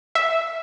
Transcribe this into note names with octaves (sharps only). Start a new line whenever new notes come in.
E5